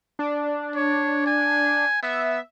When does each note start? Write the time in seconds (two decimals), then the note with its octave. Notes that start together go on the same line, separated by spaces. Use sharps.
0.19 D4
0.76 C#5
1.26 G#5
2.03 B3 E5